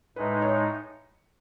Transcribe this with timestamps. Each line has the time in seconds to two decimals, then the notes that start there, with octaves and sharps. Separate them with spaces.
0.16 A2 G#3 D#4 B4
0.42 C#5